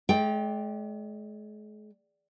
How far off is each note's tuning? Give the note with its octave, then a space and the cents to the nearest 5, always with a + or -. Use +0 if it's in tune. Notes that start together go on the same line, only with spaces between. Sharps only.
G#3 +40 D5 +0 G5 +5